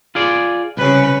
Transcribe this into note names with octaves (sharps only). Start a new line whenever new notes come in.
F4 G#4 D5
C2 C#3 B4